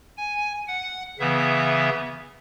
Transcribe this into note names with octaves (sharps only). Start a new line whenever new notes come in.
G#5
F#5
C#3 E3 B3 E5